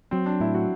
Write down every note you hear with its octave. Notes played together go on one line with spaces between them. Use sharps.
F#3 C4
D4
A2 E4
F#4